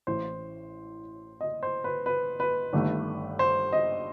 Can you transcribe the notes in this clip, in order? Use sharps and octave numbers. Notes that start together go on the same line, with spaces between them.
A1 A2 E3 C5
D#5
C5
B4
B4
B4
G1 G2 D#3 A3
C5
D#5